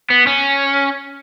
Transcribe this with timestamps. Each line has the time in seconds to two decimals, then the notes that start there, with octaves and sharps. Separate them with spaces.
0.10 B3
0.27 C#4